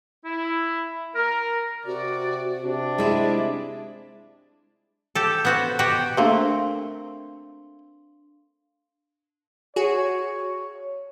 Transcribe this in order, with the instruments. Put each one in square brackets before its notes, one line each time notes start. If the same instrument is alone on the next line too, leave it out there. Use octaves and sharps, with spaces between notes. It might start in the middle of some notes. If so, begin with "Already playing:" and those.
[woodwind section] E4
A#4
[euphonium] C3 [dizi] F#4 [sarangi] D5
[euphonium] C3 [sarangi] D4
[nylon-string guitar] G#3 E4 F4 [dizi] E5
[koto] G4 A4
B3 F#4 C5
B2 F#4 G4 G5
[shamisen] A3 A#3 C4 [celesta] D4 F5 C6
[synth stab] F#4 G#4 [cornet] C#5